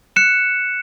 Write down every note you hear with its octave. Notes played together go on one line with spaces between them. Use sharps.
F#6 C#7 E7